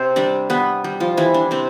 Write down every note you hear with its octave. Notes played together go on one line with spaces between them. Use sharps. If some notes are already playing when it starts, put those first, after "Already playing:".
Already playing: C3 C4 C5
G3 D4 D5
G3 B3 B4
G3
F3 F4
E3 G3 E4
D4
C3 C4